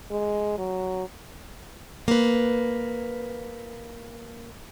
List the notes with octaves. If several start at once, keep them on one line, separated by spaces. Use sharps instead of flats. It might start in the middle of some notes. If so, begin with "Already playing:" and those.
G#3
F#3
A#3 B4